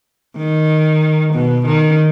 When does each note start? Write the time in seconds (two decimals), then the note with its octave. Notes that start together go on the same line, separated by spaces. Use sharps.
0.38 D#3
1.34 B2
1.66 D#3